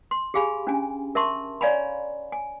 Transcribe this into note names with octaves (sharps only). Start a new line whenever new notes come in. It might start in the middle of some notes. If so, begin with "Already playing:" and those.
C6
G4 G#4 F5 G#5 B5
C#4 D4 G#5
A#4 E5 A5 C6 C#6
C#5 D5 F5 G#5 A#5 B5
G#5